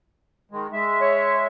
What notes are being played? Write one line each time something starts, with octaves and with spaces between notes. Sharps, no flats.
D#3 G#3
G#3 E5
C#5